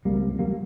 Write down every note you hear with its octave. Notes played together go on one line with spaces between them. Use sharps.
C#2 C3 G3 A#3
G3 A#3